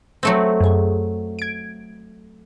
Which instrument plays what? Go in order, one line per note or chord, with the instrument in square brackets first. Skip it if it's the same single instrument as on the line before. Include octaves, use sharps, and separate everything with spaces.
[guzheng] F#3 A3 C4
[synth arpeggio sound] F#2 G#4
G#6 D7